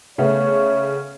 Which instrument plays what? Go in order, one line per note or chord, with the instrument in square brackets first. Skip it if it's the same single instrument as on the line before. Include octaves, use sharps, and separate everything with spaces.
[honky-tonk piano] C#3 A3 B3 [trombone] C#5